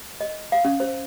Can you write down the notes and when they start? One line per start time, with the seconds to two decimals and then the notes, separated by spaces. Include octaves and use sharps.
0.21 D#5
0.52 F5
0.65 C#4
0.80 C5